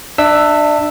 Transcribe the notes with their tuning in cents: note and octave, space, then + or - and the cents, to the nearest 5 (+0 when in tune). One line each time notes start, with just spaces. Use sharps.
D4 +25 E5 +0 E6 +0